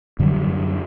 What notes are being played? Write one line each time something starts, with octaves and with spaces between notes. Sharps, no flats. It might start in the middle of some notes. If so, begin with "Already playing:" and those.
F#2 D3 F#3 G3